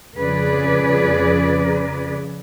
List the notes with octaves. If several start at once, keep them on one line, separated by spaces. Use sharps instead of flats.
F2 C#3 F3 G#4 B4 D5